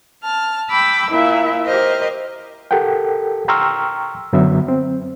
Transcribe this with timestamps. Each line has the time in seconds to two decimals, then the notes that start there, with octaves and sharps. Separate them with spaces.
0.22 A5 F6
0.70 G5 B5 D6 E6
1.10 A#2 E4 E5
1.67 G4 A#4 C5 D#5
2.71 G4 A4 A#4 F#5 G5
3.48 G5 A#5 C6 C#6 E6 F6
4.33 F#2 D3 F#3 B3 E5
4.68 C4